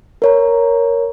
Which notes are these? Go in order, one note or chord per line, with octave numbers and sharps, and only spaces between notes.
A#4 C#5 A#5